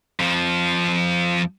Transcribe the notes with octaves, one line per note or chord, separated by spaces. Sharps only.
F2 F3